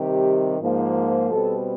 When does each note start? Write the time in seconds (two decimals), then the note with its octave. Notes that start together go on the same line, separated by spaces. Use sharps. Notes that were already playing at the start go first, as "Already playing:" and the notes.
Already playing: C3 D#3 G3 G4
0.60 G#2 F3 A#3
1.31 B2 G3 C4 A4